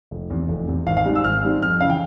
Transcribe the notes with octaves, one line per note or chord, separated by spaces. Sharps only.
F1
E2 C3
F1
E2 C3
G#1 F5
F5
G#2 G3 C4
E6
G#1 F6
G#2 G3 C4
F2 F6
C#3 E3 F5 G5